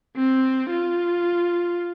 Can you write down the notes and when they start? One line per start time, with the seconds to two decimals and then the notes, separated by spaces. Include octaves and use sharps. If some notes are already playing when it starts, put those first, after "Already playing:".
0.16 C4
0.70 F4